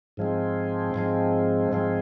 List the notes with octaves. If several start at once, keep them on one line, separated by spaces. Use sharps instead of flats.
G#2 F3 G#3 C4
G#2 F3 G#3 C4
G#2 F3 G#3 C4